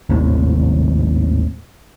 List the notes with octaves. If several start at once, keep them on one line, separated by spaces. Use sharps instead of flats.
G#1 D#2 A2 C3